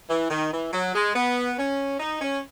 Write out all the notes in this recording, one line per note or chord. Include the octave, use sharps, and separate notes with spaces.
E3
D#3
E3
F#3
G#3
B3
C#4
D#4
C#4